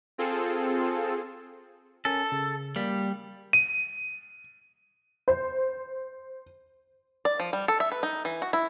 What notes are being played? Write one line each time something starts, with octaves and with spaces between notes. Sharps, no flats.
C4 F4 G#4 A4
C#4 A4 A#4 G#5
C#3
G3 A#3 D5 B6
D#7
C5
D5
F3
G3
A4
E5
B4
D#4
E3
F#4
E4